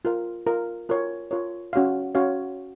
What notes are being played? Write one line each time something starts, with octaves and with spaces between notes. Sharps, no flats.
F4 A#4 F5
F4 A#4 F5
F4 A#4 C#5
F4 A#4 C#5
C#4 F#4 C#5 F5
C#4 F#4 C#5 F5